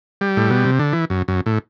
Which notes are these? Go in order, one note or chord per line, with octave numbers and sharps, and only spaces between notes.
G3
A2
B2
C3
D3
E3
F#2
F#2
A2